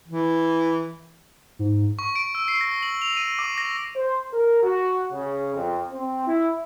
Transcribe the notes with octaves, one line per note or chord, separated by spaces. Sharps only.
E3
G#2
C#6
D7
E6
C7
A#6
F#7
F7
D#7
D6
A#6
C5
A#4
F#4
C#3
F2
C4
E4